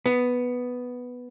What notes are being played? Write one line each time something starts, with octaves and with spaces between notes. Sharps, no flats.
B3